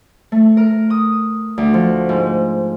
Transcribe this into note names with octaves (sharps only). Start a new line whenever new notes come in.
A3
A#4
D#6
D2
F3
G#2